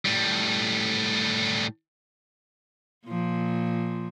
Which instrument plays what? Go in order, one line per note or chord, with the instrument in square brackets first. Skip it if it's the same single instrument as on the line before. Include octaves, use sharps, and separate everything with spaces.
[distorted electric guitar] A2 G3
[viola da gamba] A#2 F3